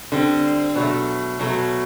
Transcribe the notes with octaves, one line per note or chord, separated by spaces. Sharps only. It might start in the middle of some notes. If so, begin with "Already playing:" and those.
D3 G3 C4
B2 F#3 A3
B2 F#3 A3